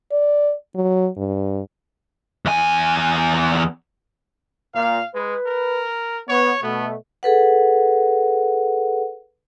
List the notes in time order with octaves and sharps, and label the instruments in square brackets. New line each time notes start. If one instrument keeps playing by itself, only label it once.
[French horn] D5
F#3
G2
[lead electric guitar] E2 G#5
[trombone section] A#2 A#4 [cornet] F5
[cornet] G#3 [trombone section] B4
[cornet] A#4
[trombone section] B3 [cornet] C#5
[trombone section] B2 A3 [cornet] B3
[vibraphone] G#4 A4 B4 F#5